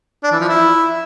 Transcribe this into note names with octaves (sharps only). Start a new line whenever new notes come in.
D4
E3
F3
E4